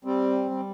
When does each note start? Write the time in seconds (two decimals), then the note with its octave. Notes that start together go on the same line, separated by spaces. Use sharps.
0.05 G3 C4
0.51 G3